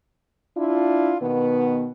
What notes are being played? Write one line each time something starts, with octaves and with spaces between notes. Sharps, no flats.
D4 E4 F4
B2 D#3 B3